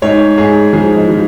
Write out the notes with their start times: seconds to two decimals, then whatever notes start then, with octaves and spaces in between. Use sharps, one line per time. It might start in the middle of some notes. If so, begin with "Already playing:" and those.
0.02 G#2 C#5
0.38 G#2 G#4
0.73 F3 G#4
0.97 D#4
1.08 F3